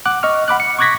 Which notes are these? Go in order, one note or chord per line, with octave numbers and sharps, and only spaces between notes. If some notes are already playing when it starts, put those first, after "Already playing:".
F#5 D6 F#6
D#5 C#6 F6
F#5 B5 D6 F#6
C#7
C#6 D6 F#6 G#6 A#6 B6